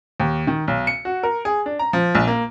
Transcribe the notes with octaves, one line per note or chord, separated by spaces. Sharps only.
D#2
D#3
B1
C#7
F#4
A#4
G#4
D4
A#5
F3
A#1
A#3